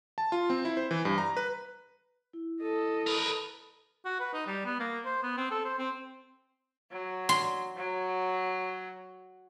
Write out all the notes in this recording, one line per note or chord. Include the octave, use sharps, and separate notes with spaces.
A5
F4
C4
E4
C5
E3
G2
A#5
B4
E4
A4 D#5
A#4 B4
F#4
B4
D#4
G3
B3
A#3
C5
B3
C4
A4
C5
C4
F#3
C6
F#3